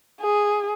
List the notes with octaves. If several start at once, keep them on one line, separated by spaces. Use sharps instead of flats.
G#4